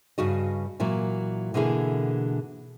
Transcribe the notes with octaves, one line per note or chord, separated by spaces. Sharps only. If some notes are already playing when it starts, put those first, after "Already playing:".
G2 C#3 F#4 D#5
A#2 E3 F#3 A#3
B2 D3 E3 A#3 E4 G#4